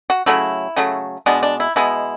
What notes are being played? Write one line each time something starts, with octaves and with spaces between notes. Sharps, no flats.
F#4
C#3 F#3 A3 E4
C#3 F#3 A3
B2 G#3 B3 D4
D4
E4
B2 G#3 B3 E4